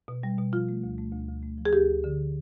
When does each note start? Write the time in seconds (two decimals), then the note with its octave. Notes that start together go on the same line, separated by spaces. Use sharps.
0.08 B2
0.23 G3
0.38 B2
0.52 F3 F4
0.69 A3
0.84 D2
0.98 A3
1.13 D2
1.28 D2
1.43 A3
1.58 F3
1.65 G#4
1.73 D2 G4
1.89 D2
2.04 D3